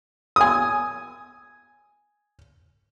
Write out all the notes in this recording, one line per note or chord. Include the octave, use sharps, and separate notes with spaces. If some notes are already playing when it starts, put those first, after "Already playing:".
G#5 D#6